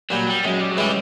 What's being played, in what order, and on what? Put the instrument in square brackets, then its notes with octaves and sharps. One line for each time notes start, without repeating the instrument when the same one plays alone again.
[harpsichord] A#2 G3 [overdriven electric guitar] F#3
[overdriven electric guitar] G3
[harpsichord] F#2 [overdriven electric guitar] G#3
[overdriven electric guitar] G3
F#3
[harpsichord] C#3 E3 G#3 [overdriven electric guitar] G3